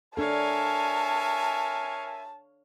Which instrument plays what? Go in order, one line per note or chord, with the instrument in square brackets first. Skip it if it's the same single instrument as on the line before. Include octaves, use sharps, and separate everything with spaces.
[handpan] D4 A4 [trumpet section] A#4 E5 G#5 [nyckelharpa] C#5 F5 [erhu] A5